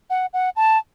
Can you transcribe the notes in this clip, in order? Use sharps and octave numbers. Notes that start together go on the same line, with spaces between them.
F#5
F#5
A5